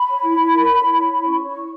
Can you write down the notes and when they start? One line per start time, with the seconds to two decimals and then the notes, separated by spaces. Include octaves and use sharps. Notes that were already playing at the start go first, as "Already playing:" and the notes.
Already playing: B5
0.09 C#5
0.23 E4
0.38 E4
0.53 A#4
0.68 C#5
0.82 E4
0.97 C#5
1.12 E4
1.26 C#4 C#6
1.41 C#5
1.46 C#6
1.56 E4